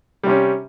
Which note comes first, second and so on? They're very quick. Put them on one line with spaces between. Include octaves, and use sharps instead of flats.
G3 C3 C#4